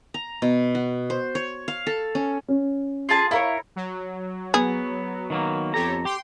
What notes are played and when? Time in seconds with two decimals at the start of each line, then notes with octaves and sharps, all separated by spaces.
0.14 A#5
0.42 B2
0.75 F#4
1.10 C5
1.35 C#5
1.68 F5
1.87 A4
2.15 C#4
2.48 C#4
3.09 F4 G#4 A5
3.31 E4 A#4 C#5 F5
3.76 F#3
4.54 B3 G#4
5.30 D#3 F#3 A#3
5.74 F2 G4 A4 C#5 A#5
6.05 G4 G5 C6